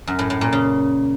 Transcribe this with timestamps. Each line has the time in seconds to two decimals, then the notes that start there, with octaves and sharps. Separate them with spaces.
0.07 F#2
0.19 A2
0.30 A2
0.41 A#2
0.53 C#3